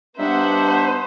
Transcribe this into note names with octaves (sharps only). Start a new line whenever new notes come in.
G2 B3 D4 D#4 C5 E5 F#5